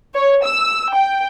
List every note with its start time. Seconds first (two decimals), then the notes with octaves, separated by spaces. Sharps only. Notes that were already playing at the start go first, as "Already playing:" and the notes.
0.15 C#5
0.44 E6
0.94 G5